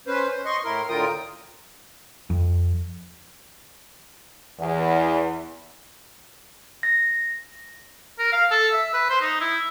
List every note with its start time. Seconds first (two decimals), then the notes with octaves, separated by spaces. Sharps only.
0.07 C#4 B4 C5
0.30 C5
0.45 D#5 C6 C#6
0.65 A2 E4 A#4 C6
0.89 A2 D3 F4 A#4 G5 D#6
2.30 F2
4.59 E2
6.83 A#6
8.19 A#4
8.33 F5
8.51 A4
8.73 E5
8.94 B4
9.10 C5
9.21 D#4
9.41 E4